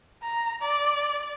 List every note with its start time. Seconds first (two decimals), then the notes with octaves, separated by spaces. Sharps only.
0.22 A#5
0.61 D5